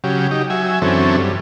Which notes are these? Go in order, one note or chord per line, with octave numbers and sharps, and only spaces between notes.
C#3 F#3 G4
D#4 G4
F#3 E5 G#5
F#2 D3 E3 C4 C#4 A4
G2